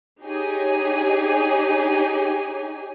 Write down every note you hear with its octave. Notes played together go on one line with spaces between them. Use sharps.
D#4 G4 G#4 C#5 G#5